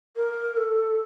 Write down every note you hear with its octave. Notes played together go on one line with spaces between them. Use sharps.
A#4
A4